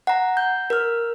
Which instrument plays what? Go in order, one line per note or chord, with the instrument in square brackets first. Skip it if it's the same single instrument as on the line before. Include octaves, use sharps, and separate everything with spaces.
[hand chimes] F#5 A#5
G6
A#4 F6